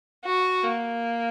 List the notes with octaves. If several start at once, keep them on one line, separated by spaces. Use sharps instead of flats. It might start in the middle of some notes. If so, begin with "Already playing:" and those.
F#4
A#3